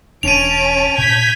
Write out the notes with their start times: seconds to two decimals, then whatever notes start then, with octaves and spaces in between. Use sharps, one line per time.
0.23 E1 C#4 D4 A5 D7 D#7 F7
0.98 A#2 G6 G#6 B6